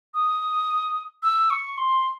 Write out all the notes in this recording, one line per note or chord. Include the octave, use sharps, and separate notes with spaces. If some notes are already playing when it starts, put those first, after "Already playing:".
D#6
E6
C#6
C6